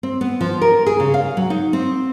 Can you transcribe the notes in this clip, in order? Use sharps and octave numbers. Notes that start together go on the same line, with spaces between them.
C4
B3
F3
A#4
G#4
C#3
F5
F#3
D#4
C4